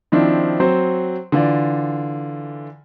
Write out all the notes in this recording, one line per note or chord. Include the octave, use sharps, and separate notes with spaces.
D#3 F3 C4 D4 E4
F#3 C4 C5
D3 E3 F4 D5